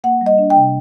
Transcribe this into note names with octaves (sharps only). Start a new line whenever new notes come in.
A#3 F#5
G3
D#5
D4
G5
C3